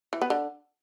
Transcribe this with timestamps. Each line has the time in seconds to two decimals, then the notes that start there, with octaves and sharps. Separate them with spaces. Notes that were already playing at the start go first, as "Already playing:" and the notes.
0.13 E3
0.21 B3
0.30 D3